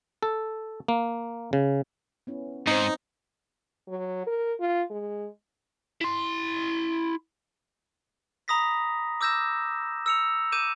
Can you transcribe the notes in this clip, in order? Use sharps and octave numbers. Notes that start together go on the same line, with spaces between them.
A4
A#3
C#3
B3 C#4 E4
G#2 C4 D#4 C5
F#3
A#4
F4
G#3
E4 C6
A#5 B5 D#6 A#6 B6
D6 E6 G6 A#6 E7
E6 C#7 F7
D6 G6 D#7 E7